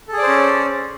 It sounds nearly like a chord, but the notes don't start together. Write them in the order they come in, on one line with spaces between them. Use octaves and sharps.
A4 G#4 D5 C5 C#4